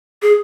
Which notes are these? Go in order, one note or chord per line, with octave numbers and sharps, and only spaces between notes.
G#4